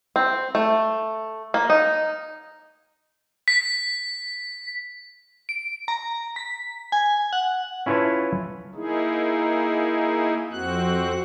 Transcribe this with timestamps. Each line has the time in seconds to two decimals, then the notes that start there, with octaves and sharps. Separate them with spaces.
0.16 C4
0.55 A3
1.54 A#3
1.70 D#4
3.48 B6
5.49 D7
5.88 A#5
6.36 B6
6.92 G#5
7.33 F#5
7.86 C#4 E4 F4 B4 C#5 A5
8.75 A#3 D#4 E4 G#4
10.51 F2 C4 F#4 F#6